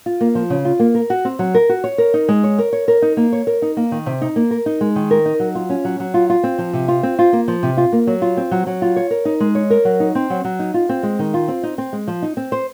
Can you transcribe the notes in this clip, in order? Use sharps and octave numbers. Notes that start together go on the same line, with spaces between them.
F4
A#3
F3
C#3
F4
A#3
A#4
F#4
C4
F#3
A#4
F#4
C#5
A#4
D#4
G#3
C#5
A#4
C#5
A#4
D#4
A#3
C#5
A#4
D#4
A#3
D#3
C3
D#4
A#3
A#4
D#4
G#3
D#3
A#4
D#4
F#3
F4
C#4
F#3
F#3
F4
F4
C4
F3
C3
F4
C4
F4
A#3
F3
C3
F4
A#3
F#3
F4
C4
F#3
F#3
F4
C#5
A#4
D#4
G#3
C#5
A#4
F#3
D#4
C4
F#3
F#3
D#4
F4
C4
G#3
D#3
F4
C4
D#4
C4
G#3
F3
D#4
C4
C5